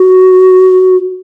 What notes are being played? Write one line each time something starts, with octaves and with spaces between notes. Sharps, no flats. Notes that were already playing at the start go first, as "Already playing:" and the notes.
Already playing: F#4